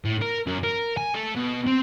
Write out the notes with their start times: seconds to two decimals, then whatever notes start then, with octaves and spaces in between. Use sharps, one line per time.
0.05 A2
0.22 A#4
0.47 F#2
0.64 A#4
0.97 G#5
1.14 A3
1.35 B2
1.67 C4